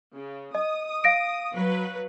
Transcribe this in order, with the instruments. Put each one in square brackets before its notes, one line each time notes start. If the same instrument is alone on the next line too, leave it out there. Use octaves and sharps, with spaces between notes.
[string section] C#3
[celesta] D#5 [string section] D#6
[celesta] F5 A#6 D7
[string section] F#3 B4